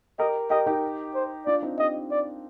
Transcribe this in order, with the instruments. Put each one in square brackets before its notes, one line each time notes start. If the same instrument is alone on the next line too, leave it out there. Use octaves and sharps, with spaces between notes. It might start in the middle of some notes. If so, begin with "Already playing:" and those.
[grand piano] G4 A#4 [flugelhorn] D#5
[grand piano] G4 A#4 [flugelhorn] D#5
[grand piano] D#4 G4
[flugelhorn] C5
[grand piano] D4 F4 [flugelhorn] D5
[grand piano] C4 D#4
[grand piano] D#4 G4 [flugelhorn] D#5
[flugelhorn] D5